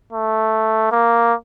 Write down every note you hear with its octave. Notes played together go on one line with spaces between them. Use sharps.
A3
A#3